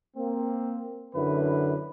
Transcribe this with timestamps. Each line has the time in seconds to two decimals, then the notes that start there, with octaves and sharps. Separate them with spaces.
0.16 A#3 C4
1.14 F#2 D3 E4 B4